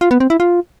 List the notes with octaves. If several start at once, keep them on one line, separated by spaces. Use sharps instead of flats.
F4
B3
C4
E4
F4